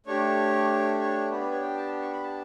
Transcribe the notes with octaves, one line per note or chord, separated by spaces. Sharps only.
A3 D4 G4 C#5
C#5
B3 D4 G4 B4
B4
C#5
G5
A5
C#6
B5
A5